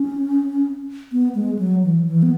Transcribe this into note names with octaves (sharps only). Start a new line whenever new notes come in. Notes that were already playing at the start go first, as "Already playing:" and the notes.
Already playing: C#4
B3
G#3
F#3
E3
E3
B3